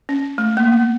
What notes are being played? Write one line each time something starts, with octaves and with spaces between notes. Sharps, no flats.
C#4
A3
A#3
B3